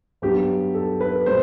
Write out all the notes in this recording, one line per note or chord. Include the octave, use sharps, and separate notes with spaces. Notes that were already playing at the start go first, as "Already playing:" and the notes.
G2 F#3 B3 G4
A4
B4
B2 G3 C5